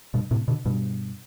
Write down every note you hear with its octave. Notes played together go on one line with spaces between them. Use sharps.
G2 B2
A2 C3
B2 D3
G2 B2